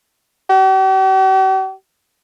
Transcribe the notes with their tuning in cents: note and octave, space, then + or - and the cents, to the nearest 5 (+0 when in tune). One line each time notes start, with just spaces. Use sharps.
G4 -45